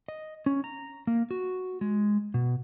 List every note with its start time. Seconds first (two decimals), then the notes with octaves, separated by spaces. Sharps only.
0.08 D#5
0.46 C#4
0.64 A#5
1.07 A#3
1.31 F#4
1.81 G#3
2.34 B2